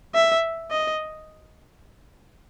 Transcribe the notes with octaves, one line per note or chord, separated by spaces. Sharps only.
E5
D#5